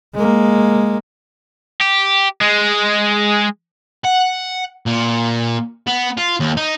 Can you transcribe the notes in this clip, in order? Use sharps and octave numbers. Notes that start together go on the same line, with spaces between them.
G#3 A#3
G4
G#3
F#5
A#2
B3
F4
D#2
D#4